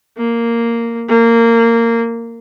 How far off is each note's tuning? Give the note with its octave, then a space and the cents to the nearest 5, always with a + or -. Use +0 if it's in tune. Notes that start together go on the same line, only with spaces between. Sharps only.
A#3 -5
A#3 -15